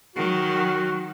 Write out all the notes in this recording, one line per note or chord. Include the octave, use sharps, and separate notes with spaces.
D#3 F#3 F#4